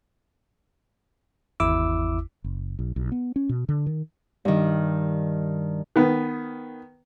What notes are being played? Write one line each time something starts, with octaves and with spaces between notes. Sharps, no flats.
G#1 E2 E4 D6 E6
F#1
B1
B1
B3
C#4
B2
D3
D#3
G2 D#3
D#3 B3